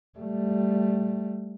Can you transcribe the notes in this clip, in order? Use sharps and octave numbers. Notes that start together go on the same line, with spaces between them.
G3 A3